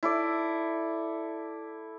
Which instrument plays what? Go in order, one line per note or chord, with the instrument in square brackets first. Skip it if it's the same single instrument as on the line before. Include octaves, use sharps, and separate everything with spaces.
[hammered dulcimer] E4 A4 D5